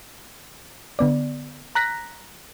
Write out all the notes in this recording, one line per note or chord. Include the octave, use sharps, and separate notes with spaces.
D3 B3 D5
A#5 F#6 A#6 B6